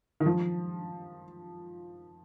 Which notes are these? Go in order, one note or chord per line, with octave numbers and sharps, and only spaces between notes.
D#3
F3